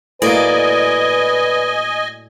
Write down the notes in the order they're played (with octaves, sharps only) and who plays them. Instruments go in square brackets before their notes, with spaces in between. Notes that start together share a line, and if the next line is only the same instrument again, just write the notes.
[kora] A2 F#3 A#3 [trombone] B4 [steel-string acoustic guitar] D5 [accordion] D#5 G#5